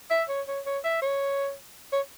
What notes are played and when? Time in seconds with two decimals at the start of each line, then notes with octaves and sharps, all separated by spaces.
0.11 E5
0.29 C#5
0.48 C#5
0.66 C#5
0.84 E5
1.02 C#5
1.92 C#5